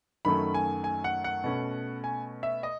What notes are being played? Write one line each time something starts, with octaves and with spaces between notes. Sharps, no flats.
F#2 D#3 F#3 A3 C#4 B5
G#5
G#5
F#5
F#5
B2 A3 C#4
G#5
E5
D#5